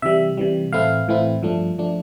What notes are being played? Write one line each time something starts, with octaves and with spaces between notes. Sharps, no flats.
C3 E3 G3 E5
C3 E3 G3
A2 E3 A3 C4 E4 F5
A2 E3 A3 C4 E4
G2 F3 A3 D4
F3 A3 D4